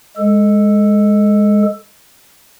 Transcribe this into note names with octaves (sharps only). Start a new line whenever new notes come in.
G#3 A4